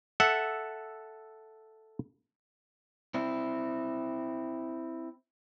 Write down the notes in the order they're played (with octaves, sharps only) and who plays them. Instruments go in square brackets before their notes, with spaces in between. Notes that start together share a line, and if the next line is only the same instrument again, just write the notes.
[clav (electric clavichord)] A4 E5 F#5
[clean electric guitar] C4 E4